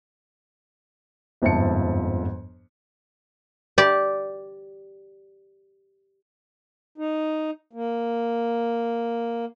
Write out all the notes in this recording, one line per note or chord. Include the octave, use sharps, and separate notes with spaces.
G1 F2 G#2 E5 A5 C#7
G4 D5
D#4
A#3